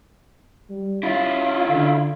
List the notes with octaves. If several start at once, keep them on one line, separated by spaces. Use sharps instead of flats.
G3
C#4 E4 F4
D3